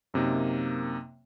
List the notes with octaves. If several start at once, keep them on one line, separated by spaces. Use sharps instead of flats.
F#2 C3 A#3 D#4